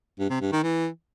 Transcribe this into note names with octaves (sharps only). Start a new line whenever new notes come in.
G2
C3
G2
D#3
E3